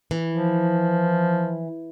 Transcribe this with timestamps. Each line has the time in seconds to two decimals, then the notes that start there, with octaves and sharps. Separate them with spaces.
0.11 E3
0.30 F3